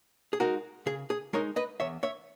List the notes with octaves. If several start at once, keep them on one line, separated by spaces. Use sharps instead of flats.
G#4
G#3 D#4 F#4 A#4
C#3 G#4
G#4
G#3 D#4 A#4 C#5
B4 D#5
E2 C#5 E5
C#5 E5